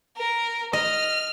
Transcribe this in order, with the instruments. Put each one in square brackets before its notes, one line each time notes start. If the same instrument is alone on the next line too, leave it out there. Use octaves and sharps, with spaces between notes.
[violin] A#4
[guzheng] D#5 [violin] F6